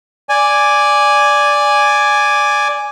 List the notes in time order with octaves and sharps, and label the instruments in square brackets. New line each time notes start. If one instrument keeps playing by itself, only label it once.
[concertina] D5 G#5